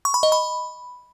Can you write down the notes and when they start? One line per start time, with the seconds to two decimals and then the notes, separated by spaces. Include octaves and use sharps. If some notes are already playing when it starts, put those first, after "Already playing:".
0.05 C#6
0.14 B5
0.23 D#5
0.32 B5